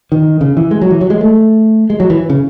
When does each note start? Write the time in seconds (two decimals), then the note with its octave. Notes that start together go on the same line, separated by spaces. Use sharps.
0.12 D#3
0.41 C#3
0.57 E3
0.71 G#3
0.82 F#3
0.91 E3
1.01 F#3
1.10 G#3
1.21 A3
1.90 G#3
2.00 F#3
2.10 E3
2.30 C#3